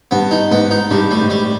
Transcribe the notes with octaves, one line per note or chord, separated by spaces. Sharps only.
G2 B3
D#4
G#2 B3
D#4
G2 G3
A2 G3
G#2
A2 G3